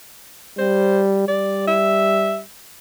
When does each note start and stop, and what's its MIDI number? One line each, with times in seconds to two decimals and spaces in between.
0.58 1.26 55
0.58 1.02 72
1.28 2.44 55
1.28 1.66 74
1.67 2.39 76